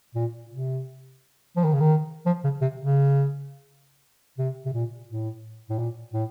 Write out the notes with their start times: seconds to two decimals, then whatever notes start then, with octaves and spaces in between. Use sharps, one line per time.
0.15 A#2
0.50 C3
1.56 F3
1.64 D#3
1.73 C#3
1.80 D#3
2.26 F3
2.44 C#3
2.61 C3
2.80 C#3
4.38 C3
4.65 C3
4.73 A#2
5.08 A2
5.70 A2
5.78 A#2
6.13 A2